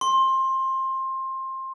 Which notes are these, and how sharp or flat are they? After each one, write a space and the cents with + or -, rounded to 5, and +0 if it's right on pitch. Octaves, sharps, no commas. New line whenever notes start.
C6 +20